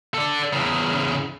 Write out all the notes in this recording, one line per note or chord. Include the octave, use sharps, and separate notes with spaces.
A4 D5
E2 C#3